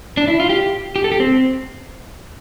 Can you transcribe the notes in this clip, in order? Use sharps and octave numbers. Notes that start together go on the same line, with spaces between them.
D4
E4
F4
G4
G4
A4
G4
C4